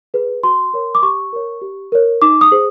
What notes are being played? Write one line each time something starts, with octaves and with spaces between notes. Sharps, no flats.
G#4 B4
F#4 C6
A#4 C#5
D6
G4 C#6
A#4 C#5
G4
A#4 C#5
D#4 D6
D#6
G#4 C5